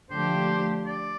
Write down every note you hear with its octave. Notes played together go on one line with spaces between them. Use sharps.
D3 F3 A3 D4 G4 C5
D5